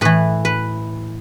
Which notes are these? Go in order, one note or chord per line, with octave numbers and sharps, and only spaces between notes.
A2 E3 B4
B4